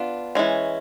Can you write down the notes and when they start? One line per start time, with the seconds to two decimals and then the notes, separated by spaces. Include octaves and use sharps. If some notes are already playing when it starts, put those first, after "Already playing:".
Already playing: B3 D4 F4
0.35 E3 G#3 C#4